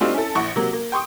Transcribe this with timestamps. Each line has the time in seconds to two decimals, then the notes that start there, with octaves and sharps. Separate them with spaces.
0.01 G3 A3 C4 D4 D#4 F4
0.14 C#4 E4 A4
0.35 A#1 E4 F#5 C#6
0.56 C3 F#3 A#3
0.73 A#3
0.92 G5 C6 C#6 D#6